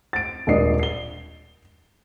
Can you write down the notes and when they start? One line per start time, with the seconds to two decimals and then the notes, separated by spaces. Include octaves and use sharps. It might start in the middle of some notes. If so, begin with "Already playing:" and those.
0.13 A6 D7
0.47 D#1 G#3 D4 D#5 C7
0.79 C7 G7